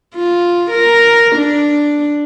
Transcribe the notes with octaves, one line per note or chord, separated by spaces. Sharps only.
F4
A#4
D4